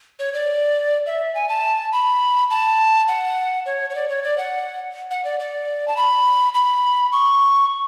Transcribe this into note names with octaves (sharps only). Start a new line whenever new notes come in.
C#5
D5
E5
G#5
A5
B5
A5
F#5
C#5
C#5
D5
C#5
D5
F#5
F#5
D5
D5
A5
B5
B5
C#6